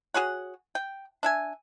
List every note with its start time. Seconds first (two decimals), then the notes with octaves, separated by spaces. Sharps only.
0.14 F#4 G#4 C#5 F#5
0.75 G5
1.23 D4 E5 G#5